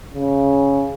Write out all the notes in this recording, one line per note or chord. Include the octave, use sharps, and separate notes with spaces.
C#3